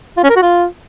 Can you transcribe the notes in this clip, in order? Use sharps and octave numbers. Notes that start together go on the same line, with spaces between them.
F4
C#4
A#4
F#4
F4